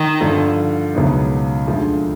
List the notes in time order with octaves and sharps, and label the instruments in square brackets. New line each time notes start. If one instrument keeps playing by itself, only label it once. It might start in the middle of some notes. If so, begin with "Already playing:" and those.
Already playing: [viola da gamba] D#3
[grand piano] G2 D3 F3
C#2 B2 F#3 B3 D#4
D2 D3 F3 G#3